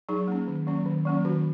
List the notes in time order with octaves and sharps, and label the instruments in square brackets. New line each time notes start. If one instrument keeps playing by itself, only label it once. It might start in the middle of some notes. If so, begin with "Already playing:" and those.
[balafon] F#3 D#4 G#4
A#3 C#4
D#3
F#3 A#3 C#4
D#3
F#3 A#3 C#4
D#3 F#4